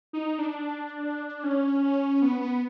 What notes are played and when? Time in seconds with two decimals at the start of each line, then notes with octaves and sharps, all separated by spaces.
0.13 D#4
0.39 D4
1.44 C#4
2.22 B3
2.41 B3